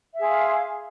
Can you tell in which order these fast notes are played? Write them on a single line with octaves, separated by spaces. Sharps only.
E5 G#4 C6 F5